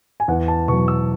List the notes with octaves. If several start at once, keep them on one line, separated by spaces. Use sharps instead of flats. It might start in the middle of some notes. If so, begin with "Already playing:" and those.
G#5
E2 F#5
A5
B2 F#3 C#6
E6